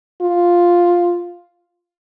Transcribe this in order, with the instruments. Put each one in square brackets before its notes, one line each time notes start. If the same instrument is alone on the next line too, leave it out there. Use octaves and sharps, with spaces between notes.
[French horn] F4